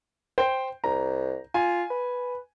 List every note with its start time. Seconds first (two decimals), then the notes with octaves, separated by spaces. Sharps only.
0.38 C5 G5
0.84 C2 A#5
1.54 F4 G#5
1.90 B4